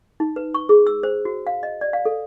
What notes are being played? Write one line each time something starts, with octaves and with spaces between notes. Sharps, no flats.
D#4
B4
C#6
G#4
E6
C5
F#4
F5
D#5
D5
F5
A4